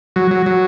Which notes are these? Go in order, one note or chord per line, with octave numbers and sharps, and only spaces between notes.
F#3
F#3
F#3